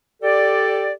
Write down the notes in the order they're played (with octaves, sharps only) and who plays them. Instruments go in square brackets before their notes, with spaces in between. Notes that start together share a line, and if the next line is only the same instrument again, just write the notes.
[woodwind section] G4 A4 D5